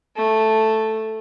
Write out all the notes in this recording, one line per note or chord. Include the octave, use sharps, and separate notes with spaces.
A3